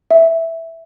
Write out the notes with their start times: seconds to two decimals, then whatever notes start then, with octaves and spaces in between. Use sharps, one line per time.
0.11 E5